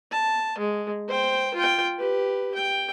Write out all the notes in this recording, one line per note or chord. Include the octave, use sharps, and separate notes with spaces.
A5
G#3
C5 G5
F4 G5
G4 B4
G5